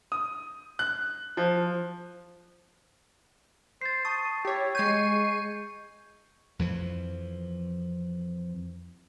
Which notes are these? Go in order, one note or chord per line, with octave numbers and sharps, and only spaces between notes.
D#6
F#6
F3
C5 A6 C7
A5 C#6 D#6
E4 G4 C#5
G#3 C#6 G6 G#6 C7 D#7
F2 E3 F3